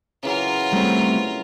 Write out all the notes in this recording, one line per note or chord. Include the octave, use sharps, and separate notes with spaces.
C#3 E3 F#3 F4 A#4
G3 A3 C4